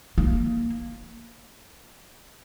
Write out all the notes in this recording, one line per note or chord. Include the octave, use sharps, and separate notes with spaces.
A#3